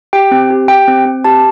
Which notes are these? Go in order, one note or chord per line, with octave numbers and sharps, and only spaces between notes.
G4 G5
C4
G4
G4 G5
C4
C4
G4 A5